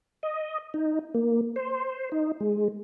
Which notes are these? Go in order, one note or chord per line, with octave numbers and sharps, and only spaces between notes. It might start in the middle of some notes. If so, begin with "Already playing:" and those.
D#5
D#4
A#3
C5
D#4
G#3